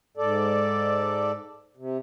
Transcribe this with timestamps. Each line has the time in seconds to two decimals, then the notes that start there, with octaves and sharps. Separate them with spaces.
0.17 G#2 A4 D5
1.77 C3